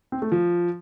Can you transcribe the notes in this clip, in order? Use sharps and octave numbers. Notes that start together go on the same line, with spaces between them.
C4
A3
F3